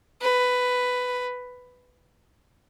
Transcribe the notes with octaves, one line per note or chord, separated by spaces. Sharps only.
B4